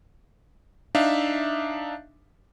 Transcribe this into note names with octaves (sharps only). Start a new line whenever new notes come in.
D4 D#4 E5 F5